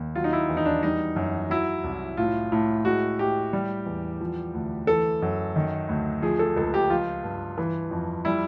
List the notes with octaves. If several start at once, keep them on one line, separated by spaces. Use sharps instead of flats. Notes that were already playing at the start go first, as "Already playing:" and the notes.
Already playing: D#2
F#3 F4
D#4
E4
E2
D#4
D4
G3 D#4
F#2
F#3 E4
C2
A2 F4
A2
G#3 F#4
A2 G4
G3
E2
F3
D2
E3 A4
F#2
D#3
D2
F3 G#4
A4
C#2 A4
G4
F3 F4
G2
E3
F2
G3 E4